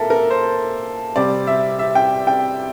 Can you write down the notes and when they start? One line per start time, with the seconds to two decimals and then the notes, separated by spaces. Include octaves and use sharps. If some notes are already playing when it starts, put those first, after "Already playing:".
Already playing: A#2 A4 A#4 E5
0.10 A#4
0.30 C5
1.16 C3 G3 C4 D5
1.47 E5
1.79 E5
1.95 G5
2.27 G5